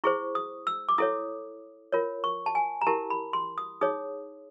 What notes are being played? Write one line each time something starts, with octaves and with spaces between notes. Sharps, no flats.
E4 G#4 C5 C#6
D#6
E6
D6
E4 A4 C#5 D#6
F4 A#4 C#5
C#6
A5
G#5
A#5
E4 G4 A#4 A5
B5
C6
D#6
D#4 G#4 C#5 D#6